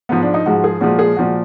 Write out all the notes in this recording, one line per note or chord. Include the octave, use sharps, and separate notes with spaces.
G#2 F3 G#3 B3
D4
D#4
G#2 F3 G#3 F#4
G#4
A#2 F3 G#3 F#4
G#4
A#2 F3 G#3 F#4